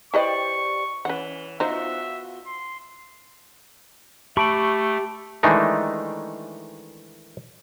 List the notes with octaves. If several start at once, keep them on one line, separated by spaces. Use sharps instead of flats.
E4 G4 B4 C5 D5 D#5 C#6
E3 C#4 B4 F#5
B3 D#4 F4 F#4 C5 E5
C6
A3 G4 A5 B5 C#6 D7 F#7
D#3 E3 G#3 A3 D4 D#4